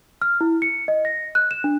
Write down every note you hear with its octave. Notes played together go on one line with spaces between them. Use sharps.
F6
E4
C#7
D#5
A#6
F#6
E7
D4